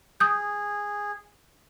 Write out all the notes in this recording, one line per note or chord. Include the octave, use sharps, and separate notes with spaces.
G#4 D#6 G6